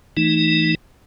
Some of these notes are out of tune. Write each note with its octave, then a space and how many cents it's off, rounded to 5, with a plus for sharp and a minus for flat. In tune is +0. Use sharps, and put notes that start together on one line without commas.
E3 +0 A3 +15 D#4 +0